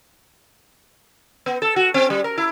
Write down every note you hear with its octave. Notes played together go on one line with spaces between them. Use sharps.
B3
A4
F#4
C4
G3
A#4
E4